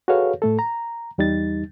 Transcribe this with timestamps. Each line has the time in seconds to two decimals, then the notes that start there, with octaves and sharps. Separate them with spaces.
0.08 F#4 G#4 A4 B4 C#5 F5
0.42 A2 A3 A4
0.59 A#5
1.18 E2 G3 D#4 A6